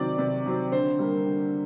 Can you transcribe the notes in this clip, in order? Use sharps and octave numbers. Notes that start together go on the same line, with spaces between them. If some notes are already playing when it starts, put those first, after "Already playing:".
Already playing: C3 D#3 F#3 C4 D5
C3
D#3 F#3 C4
D3 C5
G3 A#3
D3